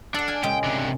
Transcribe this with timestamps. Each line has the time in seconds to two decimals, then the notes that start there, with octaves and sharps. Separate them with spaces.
0.14 D4 A4 F#5
0.28 F5 G#5
0.43 A#2 C#3 G#3 G5
0.64 C3 D4